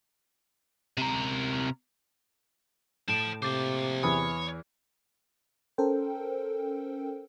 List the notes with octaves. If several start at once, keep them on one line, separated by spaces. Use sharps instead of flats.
C3 A#4
A2 C5 A5 D7 E7
C3 A#3 C5 D6 A6
E2 E3 C#5 G#5 B5 D#6
C#4 A4 A#4 C5 G5